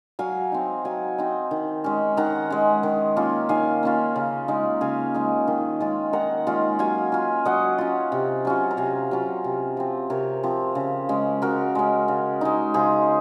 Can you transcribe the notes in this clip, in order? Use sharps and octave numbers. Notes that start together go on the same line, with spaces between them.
F#3 F5 G#5
C4 D#4
F#3 F5 G#5
C4 D#4
D#3
G#3 C#4
D#3 F#5 A#5
G#3 C#4
D#3
A#3 C#4 F4
D#3 F5 G#5
A#3 C#4 F4
C#3
G#3 D#4
C#3 F5 G#5
G#3 D#4
D#3
G#3 C#4 F4
D#3 F#5 A#5
G#3 C#4 F4
F#3 F5 G#5
C#4 F4
F#3 D#5 F#5
C#4 F4
C3
F#3 C#4 F4
A#5
C3 F5 G#5
F#3 C#4 F4
C3
F3 C4
C3 A#4 C#5
F3 C4
C#3
G#3 C#4
C#3 F#4 A#4
G#3 C#4
C#3
G#3 D#4
C#3 G#4 C5